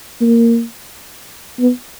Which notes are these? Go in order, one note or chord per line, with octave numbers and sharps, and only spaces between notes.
A#3
B3